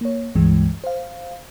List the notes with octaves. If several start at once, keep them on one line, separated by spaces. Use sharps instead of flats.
A#3 C#5
C#2 G2 E3 G#3
C5 F5